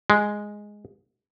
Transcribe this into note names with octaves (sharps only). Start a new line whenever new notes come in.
G#3